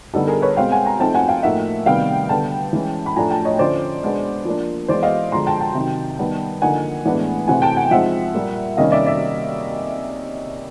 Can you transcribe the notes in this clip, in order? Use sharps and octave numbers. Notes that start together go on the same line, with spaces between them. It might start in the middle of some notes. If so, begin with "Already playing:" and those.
D3 G3 B3 D#4 G4 A4
G#4 A#4
B4 C#5
B2 G#3 C4 F5 G5
F#5 G#5
G#5 A#5
F3 A3 C4 D#4 G5 A5
F#5 G#5
F5 G5
A2 F3 A#3 D#4 E5 F#5
C3 D#3 G3 B3 F5 G5
D3 G3 B3 G5 A5
E3 G#3 C#4
B5
A2 F3 A3 D4 G#5 A#5
G5 A5
C#5 D#5
D3 F3 A3 C#4 C5 D5
B2 G#3 B3 D4
F3 A#3 D4
E3 G#3 B3 C5 D5
D#5 F5
D3 F3 G#3 A#5 C6
G5 A5
G5 A5
C3 D#3 F#3
D#3 G3 B3
D3 F3 A#3 D#4 F#5 G#5
A2 E3 G#3 B3 D4
C3 E3 A3 C4 F#5 G#5
G5 A5
F#5 G#5
F3 G#3 C4 D#4 E5 F#5
A#2 G3 A#3
C3 D#3 G3 A#3 C#4 D#5 F5
D5 E5
D5 E5